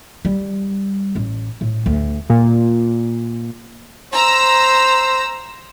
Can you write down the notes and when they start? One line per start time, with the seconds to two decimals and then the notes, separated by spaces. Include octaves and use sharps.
0.25 G3
1.15 A1
1.61 A2
1.86 D2
2.30 A#2
4.14 C5 A#5 E6